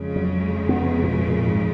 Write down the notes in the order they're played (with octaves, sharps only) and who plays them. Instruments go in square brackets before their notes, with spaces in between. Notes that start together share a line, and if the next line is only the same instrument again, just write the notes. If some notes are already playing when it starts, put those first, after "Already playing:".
Already playing: [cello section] F2 C#3 G#3
[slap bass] F#3
B3
A#2
B2
A#2
G#2